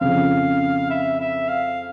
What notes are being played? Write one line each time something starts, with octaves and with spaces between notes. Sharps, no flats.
F2 C#3 F3 F5
E5
E5
F5